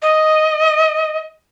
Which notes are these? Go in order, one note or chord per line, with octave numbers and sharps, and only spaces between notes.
D#5